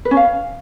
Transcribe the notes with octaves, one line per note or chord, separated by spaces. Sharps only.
B4
C#4
F5